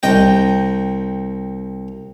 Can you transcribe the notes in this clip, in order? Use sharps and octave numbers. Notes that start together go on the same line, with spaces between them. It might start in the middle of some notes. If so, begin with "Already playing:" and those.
C2 D#5 G5